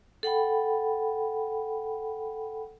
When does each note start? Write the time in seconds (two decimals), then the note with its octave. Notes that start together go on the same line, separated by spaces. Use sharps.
0.23 A4 F#5 G5 B5